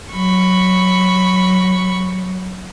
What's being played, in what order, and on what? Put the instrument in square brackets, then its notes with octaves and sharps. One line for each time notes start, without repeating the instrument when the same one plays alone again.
[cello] F#3 [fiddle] B5 C#6